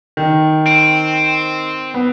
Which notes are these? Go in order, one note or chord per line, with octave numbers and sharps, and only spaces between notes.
D#3
C4
B3